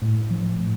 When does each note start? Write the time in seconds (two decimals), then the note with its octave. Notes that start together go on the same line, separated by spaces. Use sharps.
0.02 A2
0.31 F3
0.60 A2